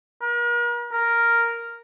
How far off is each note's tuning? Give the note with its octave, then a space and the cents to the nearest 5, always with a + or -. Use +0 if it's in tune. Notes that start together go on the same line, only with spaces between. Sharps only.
A#4 +45
A#4 +0